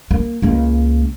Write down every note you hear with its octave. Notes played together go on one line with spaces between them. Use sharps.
A#3
C#2 A#3